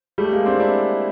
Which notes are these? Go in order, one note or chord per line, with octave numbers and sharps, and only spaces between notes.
G3 A3
G#3 A#3
C4 D4
D4 E4